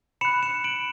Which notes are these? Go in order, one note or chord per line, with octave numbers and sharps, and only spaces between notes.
B5 F#6 C#7 E7
C#7 E7
D7 F#7